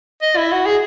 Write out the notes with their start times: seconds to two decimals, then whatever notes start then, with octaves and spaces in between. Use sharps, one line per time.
0.22 D#5
0.37 E4
0.52 F#4
0.66 G#4